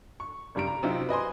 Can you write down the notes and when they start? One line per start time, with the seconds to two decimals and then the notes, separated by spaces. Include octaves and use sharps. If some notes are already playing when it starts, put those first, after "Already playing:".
0.20 C#6
0.55 F#1 G2 G3 A#5 D7
0.67 A#5
0.83 C3 F#3 C4 D#4 F4
1.09 B4 D#5 G#5 C6